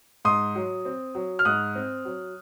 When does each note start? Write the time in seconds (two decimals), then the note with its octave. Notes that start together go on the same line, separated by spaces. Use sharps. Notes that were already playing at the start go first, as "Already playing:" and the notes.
0.25 G#2 C6 D#6
0.55 F#3
0.85 C4
1.15 F#3
1.39 F6
1.45 G#2 D#6 F#6
1.75 C4
2.05 F#3